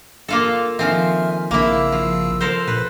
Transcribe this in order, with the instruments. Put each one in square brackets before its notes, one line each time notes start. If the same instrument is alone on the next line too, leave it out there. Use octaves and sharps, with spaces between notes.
[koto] A#3 F4 A4
[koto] D#3 F3 C4 [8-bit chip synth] E5 G#5 F6
[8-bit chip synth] A#1 C#3 E6 [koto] A#3 E4
[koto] F3
A4 A#4 C5
[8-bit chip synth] A#2 [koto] B4